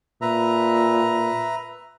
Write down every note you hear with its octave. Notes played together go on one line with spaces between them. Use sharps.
A#2 B4 E5 A#5